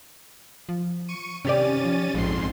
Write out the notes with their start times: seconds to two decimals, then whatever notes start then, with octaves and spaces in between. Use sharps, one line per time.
0.69 F3
1.08 C#6 C#7 D#7
1.45 C3 D#3 C#4 G4 D5 A6 D#7
1.85 F3
2.14 A#1 F2 G#2 C6